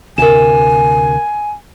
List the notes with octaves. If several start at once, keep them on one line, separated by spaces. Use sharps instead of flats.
D2 C3 A#4 G#5 E7